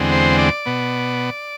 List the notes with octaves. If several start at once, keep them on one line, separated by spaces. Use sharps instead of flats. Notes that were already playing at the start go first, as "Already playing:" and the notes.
Already playing: E2 D3 G#3 C4
C5
D5
B2 B3